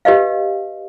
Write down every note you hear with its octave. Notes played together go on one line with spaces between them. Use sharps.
G4 B4 D#5 F5